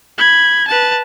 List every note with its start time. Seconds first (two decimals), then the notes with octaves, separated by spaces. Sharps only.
0.18 B5 G#6
0.67 B4 A5